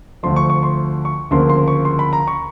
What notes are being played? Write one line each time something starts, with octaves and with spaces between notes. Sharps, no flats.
D2 D3 F3 A3 C6
C#6
C#6
C6
C#6
D2 C#3 F3 A#3 C6
C6
C#6
C6
B5
A#5
C#6